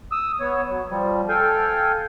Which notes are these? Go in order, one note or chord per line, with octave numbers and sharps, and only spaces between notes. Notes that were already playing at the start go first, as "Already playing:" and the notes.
D#6 E6
B3 C#5
F#3
F3 G3
A4 F5 G5 G#5